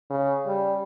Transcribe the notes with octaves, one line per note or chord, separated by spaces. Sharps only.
C#3
G3